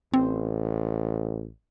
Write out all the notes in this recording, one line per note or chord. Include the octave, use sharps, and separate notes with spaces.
A1 C4